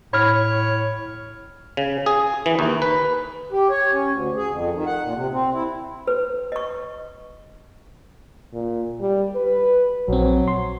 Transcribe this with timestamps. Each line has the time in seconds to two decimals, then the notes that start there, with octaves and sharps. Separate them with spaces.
0.13 A2 C#5 B5 F6
1.77 C#3
2.06 G#4
2.46 E3
2.59 D#2
2.82 B4
3.52 G4
3.70 C#5
3.92 C#4
4.11 D2
4.36 G#4
4.51 F2
4.73 D#3
4.86 F#5
5.03 A#2
5.14 C3
5.32 C4
5.53 E4
6.07 B4
6.52 D#5 C#6
8.53 A#2
9.01 G3
9.35 B4
10.08 A#1 F#3 C4
10.48 C6